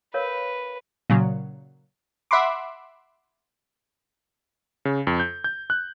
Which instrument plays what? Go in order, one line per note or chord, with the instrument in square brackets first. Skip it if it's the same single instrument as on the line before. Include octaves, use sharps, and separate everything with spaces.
[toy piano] A#4 C#5 F5 [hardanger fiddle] B4
[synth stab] A#2 C#3 F#3
E5 F#5 B5 C6 D6
[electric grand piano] C#3
F2
G6
G6
F#6